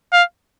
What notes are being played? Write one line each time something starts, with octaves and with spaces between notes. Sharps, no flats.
F5